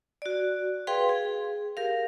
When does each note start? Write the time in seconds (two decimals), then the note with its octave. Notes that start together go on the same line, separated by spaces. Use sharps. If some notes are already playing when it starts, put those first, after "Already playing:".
0.22 F#4 D5
0.87 G#4 B4 F5 G5 C6
1.09 G#4
1.77 G4 A#4 F5